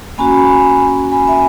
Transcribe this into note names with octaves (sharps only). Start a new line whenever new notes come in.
A#3 C#4 F#4 G#5 B5
G#5 B5
E5 G#5